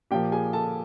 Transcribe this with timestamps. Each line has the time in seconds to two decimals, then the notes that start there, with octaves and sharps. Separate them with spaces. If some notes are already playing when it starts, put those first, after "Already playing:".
0.11 A#2 F3 A#3 G4 G5
0.32 G#4 G#5
0.53 A4 A5